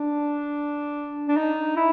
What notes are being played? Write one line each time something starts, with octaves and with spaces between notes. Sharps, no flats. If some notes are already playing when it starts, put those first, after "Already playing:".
Already playing: D4
D4
D#4
E4